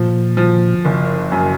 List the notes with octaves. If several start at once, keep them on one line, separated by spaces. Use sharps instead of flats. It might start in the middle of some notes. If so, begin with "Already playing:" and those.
Already playing: A#2 F3
F3
F#1
F#2